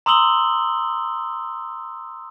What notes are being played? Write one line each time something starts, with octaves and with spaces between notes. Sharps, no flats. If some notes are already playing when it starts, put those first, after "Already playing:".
A#5 C6 D#6 E6 F#7 G7